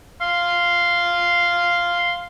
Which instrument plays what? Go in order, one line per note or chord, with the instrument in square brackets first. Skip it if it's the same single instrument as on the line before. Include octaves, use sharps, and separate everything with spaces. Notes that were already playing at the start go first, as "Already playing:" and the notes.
[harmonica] F5 C6